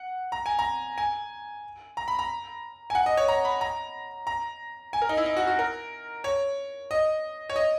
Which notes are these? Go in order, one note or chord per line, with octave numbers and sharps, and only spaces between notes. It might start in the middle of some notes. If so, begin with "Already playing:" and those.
Already playing: F#5
A#5
G#5
A#5
G#5
A#5
B5
A#5
G#5
F#5
D#5
C#5
A#5
B5
A#5
A#5
G#5
A#4
D#4
E4
D#4
F#4
F#4
A#4
C#5
D#5
C#5
D#5